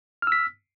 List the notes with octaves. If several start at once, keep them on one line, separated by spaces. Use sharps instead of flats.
E6 F6 B6